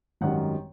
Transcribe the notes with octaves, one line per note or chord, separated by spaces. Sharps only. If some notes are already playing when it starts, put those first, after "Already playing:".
G#1 F#2 D#3 G3 F#5